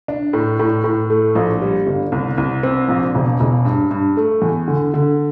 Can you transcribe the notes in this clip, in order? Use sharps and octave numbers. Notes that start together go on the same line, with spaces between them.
D4
A2
A2
A2
A3
A#1
G3
G1
C2
C2
C4
A#1
E1
E1
G2
G2
A3
E2
D3
D3